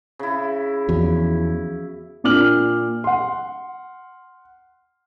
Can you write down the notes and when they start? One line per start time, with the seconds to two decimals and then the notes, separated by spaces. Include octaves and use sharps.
0.19 C#3 E4
0.89 E2 F3 F#4
2.24 A#2 D4 D6 F6 F#7
3.04 F#5 C6